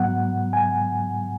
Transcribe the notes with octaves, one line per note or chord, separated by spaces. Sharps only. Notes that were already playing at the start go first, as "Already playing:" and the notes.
Already playing: G#2 F#3 B3 F#5
G#5